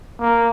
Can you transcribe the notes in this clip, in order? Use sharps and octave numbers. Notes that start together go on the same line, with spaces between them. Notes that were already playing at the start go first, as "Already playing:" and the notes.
A#3